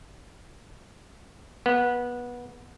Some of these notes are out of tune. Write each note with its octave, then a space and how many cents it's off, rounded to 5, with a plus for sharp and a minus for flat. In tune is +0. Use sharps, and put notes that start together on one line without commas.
B3 -20